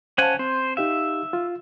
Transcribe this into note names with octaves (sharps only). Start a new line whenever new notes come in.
C#4 C5 F5 F#5 G#5 A5
C4 C5
D#4 G4 E5 F5
F4